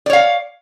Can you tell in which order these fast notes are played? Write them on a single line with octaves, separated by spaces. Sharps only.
D5 C#5 F5